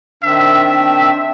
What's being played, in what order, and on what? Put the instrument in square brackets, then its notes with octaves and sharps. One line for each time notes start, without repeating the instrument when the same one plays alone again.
[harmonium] D#3 C4 D4 [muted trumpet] E5